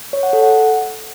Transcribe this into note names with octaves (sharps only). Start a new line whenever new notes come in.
C#5
F#5
A4
F#5